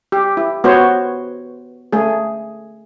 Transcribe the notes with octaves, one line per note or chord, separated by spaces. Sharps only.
G4
E4
B3 F#4 C5 C#5
A3 G#4